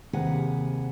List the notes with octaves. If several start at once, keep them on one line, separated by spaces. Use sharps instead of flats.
D#2 C3 G#4 B4 F#5